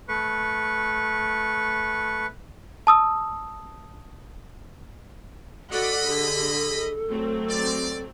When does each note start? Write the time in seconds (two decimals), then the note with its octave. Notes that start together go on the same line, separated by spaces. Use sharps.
0.08 A3 B4 C#6
2.87 A5 D#6 E6
5.72 F#4 A4 D5 D#5 F#5 B5
6.06 D3 G4 G#4
7.09 F#3 A3 C4
7.50 D5